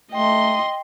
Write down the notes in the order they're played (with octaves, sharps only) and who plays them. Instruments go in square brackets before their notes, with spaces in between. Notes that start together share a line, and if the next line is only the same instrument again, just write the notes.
[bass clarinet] A3 [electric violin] D#5 C6 [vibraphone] G5